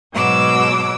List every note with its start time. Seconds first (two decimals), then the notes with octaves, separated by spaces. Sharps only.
0.12 G#2 B2 F#3 D6 E6